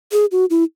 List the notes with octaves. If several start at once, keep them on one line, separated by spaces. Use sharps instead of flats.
G#4
F#4
E4